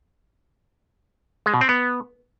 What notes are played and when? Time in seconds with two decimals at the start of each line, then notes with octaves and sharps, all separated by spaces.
1.46 G#3
1.54 B2
1.61 C4
1.69 B3